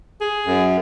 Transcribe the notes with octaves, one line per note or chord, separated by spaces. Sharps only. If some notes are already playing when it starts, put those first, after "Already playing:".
G#4
F#2